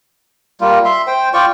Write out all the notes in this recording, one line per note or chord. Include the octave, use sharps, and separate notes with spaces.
G3 A#3 F4
E5 C6
C5 G5
F4 D5 G5 C#6